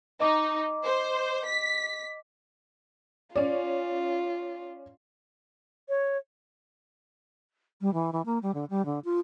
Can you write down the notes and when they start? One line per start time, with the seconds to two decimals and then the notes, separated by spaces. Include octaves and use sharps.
0.20 D#4 D#5 D6
0.85 C5
1.46 B6
3.36 C#4 F4 D5
5.89 C#5
7.81 G3
7.94 E3
8.12 E3
8.26 A#3
8.42 G3
8.54 D3
8.70 G3
8.85 D3
9.05 F4